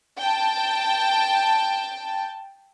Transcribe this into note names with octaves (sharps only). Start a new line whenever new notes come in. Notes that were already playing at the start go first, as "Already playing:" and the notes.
G5 A5